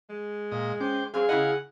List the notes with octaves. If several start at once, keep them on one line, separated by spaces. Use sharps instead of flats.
G#3
A#2 D#5
C#4 C5 G5 D6
F#3 G#3 C4 G#4 F5 G#5
C#3 E4 D#5 F#5